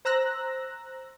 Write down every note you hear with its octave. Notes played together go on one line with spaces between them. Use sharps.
C5 A#5 E6 F#6 A#6